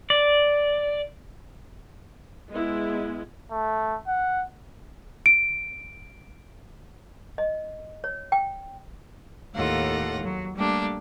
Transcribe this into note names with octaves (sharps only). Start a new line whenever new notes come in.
D5
G#3 B3 E4
A3
F#5
D7
D#5
C#5
G5
D#2 A2 F4 A4 F#5 A#6
F#3
G3 A3 A#3 D4 G4